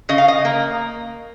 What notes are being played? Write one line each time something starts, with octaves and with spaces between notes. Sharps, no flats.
C#3 D#5
F5
D#5
A#3